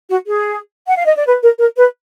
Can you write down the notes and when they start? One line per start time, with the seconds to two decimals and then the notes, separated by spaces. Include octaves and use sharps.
0.10 F#4
0.27 G#4
0.86 F#5
0.96 F5
1.06 D#5
1.16 D5
1.26 B4
1.42 A#4
1.59 A#4
1.76 B4